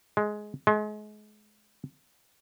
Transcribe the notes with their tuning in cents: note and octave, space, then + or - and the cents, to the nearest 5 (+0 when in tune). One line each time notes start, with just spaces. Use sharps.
G#3 +15
G#3 +35